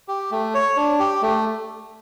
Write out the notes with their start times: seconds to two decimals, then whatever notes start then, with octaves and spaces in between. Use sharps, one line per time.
0.08 G4
0.31 A3
0.54 C#5
0.77 D4
0.99 G4
1.22 A3